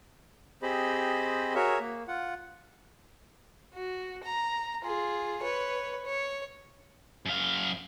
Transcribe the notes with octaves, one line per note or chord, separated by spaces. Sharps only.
C4 G4 G#4 C5 D#5 B5
F#4 G#4 A#4 C#5 E5
A#3
F4 F#5
F#4
A#5
F4 G#4
B4 C#5
C#5
F#2 F5